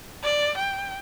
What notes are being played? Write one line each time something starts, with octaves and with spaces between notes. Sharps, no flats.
D5
G5